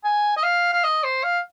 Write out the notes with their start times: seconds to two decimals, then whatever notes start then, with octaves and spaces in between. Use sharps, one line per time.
0.04 G#5
0.37 D#5
0.43 F5
0.73 F5
0.84 D#5
1.04 C5
1.23 F5